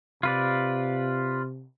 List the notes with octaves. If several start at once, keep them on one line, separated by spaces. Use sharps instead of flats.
C3 F4 B4 D5